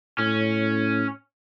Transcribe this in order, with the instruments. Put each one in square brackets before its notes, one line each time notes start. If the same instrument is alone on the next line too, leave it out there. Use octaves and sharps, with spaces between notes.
[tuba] A2 [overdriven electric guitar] C#4